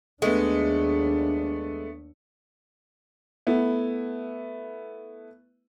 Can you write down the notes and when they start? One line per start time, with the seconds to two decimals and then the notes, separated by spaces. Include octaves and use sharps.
0.22 D#2 G#3 A3 B3 D4
3.47 A3 B3 E4